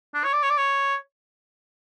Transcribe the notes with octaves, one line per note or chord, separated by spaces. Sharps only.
D4
C#5
D5
C#5
D5
C#5